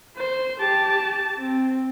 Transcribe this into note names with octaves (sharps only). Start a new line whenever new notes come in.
C5
G4 A5
C4